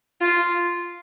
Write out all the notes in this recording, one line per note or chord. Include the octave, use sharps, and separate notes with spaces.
F4